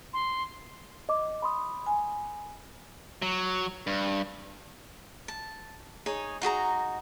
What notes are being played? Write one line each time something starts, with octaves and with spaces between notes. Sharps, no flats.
C6
D#5 D6
B5 C6 D#6
G#5
F#3
G2
A5
D#4 G#4 C#5
D#4 F#4 G#4 A#5